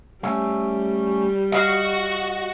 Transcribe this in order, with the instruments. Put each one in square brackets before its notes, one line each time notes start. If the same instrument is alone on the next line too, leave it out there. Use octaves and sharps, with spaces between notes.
[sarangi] G3 [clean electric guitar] A3 C#4
[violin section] F#4 [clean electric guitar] D#5 F5